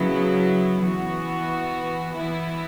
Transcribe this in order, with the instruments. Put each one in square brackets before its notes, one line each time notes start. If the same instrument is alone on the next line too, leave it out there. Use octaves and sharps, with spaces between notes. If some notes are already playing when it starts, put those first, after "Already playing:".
Already playing: [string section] C#3 F#3 B3 E4
E3 B3 F#4
E3 B3 E4